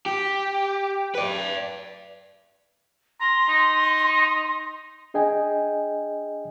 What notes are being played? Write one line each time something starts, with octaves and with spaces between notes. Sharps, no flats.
G4
B4 D5
A#5 C6
D#4
D4 G#4 D#5 G5 G#5